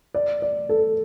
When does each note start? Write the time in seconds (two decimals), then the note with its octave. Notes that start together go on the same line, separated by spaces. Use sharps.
0.15 D5
0.42 D5
0.69 A4